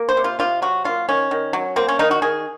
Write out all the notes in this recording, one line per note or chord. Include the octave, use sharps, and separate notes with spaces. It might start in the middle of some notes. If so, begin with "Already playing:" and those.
Already playing: A#3
C5
C3
F4
C3 F4
F#3 F#4
A#3 F4
D#3 C#4
D#3
F#3
A#3 C4
C#4
D#3 D#4
F#4
D#3 G#4